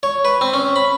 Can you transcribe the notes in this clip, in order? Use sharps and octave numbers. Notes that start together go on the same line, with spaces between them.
C#5
B4
C4
C#4
B5